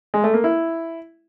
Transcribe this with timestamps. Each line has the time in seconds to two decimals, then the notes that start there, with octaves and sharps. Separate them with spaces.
0.14 G#3
0.24 A3
0.34 A#3
0.44 E4